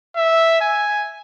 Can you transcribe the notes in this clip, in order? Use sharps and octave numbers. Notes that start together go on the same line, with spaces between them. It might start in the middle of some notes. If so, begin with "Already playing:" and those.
E5
G#5